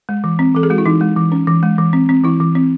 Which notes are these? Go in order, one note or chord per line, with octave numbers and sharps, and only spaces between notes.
G#3
E3
C4
E3 A4
G#4
G#3 F#4
E4
E3 D#4
G#3
E3
C#4
E3
G#3
E3
C4
C4
E3 E4
E3
C4